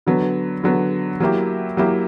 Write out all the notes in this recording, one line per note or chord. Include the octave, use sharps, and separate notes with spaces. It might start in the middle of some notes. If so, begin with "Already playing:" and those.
D3 F#3 B3
D3 F#3 B3
F#3 A#3 E4 G4
F#3 A#3 E4 G4